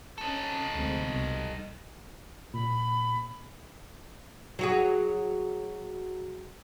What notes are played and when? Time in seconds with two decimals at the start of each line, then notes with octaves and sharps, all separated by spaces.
0.18 C#4 D#4 A4
0.73 D2 G#3 C4
1.02 C2 B2
2.54 A#2 B5
4.59 F#3 F#4 G#4